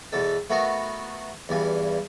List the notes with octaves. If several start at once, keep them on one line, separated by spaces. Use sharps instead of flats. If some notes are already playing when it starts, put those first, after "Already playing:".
E2 B2 A4
A3 B3 F#4 A#4
E2 G2 G#5